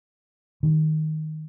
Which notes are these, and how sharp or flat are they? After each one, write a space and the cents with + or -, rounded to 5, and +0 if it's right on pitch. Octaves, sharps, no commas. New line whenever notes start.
D#3 +0 G3 +35